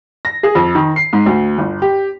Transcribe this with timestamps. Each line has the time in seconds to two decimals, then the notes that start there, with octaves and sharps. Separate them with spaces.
0.25 A#6
0.43 G#4
0.55 F2
0.75 D#3
0.96 C7
1.13 G#2
1.26 D2
1.58 G1
1.82 G4